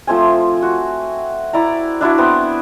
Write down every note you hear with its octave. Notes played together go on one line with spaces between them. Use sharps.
F3 A3 C4 G#5
F#4
E4 D5 A#5
D4 E4 F#4 D5
B3 C4 B4